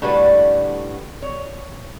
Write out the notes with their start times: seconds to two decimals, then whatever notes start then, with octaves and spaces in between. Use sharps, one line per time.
0.02 A2 D3 G3 F#4 B4
1.22 C#5